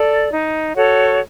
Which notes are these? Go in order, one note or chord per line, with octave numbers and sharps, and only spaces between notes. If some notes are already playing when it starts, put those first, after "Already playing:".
Already playing: A4 D5
D#4
F#4 A4 C#5